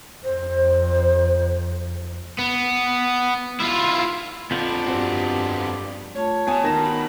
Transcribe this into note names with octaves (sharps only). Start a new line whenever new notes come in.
F2 C5
B3
E4 F4
F2 F3 B3 D4
G2 C4 F#4 C5
A3 F4 C#5 A5
B3 G#5 A5 D#6
D#3 D#4 F#4 A#5 A#6 E7
B5